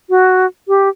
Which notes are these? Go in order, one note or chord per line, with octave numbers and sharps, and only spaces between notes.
F#4
G4